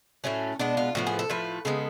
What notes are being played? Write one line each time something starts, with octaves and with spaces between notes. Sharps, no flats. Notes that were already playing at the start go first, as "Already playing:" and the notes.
A2 F#3 A3 C#4
B2 G#3 B3 D4
F4
A2 F3 B3 F#4
G#4
A4
A2 F3 A3 B4
C#3 G#3 B3 A4